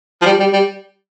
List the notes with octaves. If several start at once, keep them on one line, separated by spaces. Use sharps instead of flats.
F3
G3
G3
G3